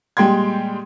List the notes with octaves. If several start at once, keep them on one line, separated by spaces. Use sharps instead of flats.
A#2 G3 G#3 G5 C6 G#6